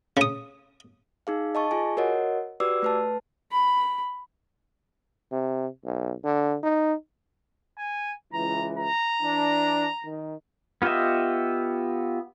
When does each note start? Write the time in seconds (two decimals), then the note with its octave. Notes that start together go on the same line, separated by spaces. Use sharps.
0.17 C#3 D#6
1.27 D#4 G#4 F5
1.55 D#5 A5 C#6
1.71 F4 G#4 G#5
1.97 F#4 A#4 C#5 D#5 F#5
2.60 F#4 G4 B4 D5 D6 E6
2.82 A3 B4 A5
3.52 B5
5.32 C3
5.85 B1
6.24 D3
6.63 D#4
7.78 G#5
8.34 C#2 E3 A#5
8.78 A#5
9.22 E3 D4
10.05 D#3
10.82 B3 F4 G4 D#5 E5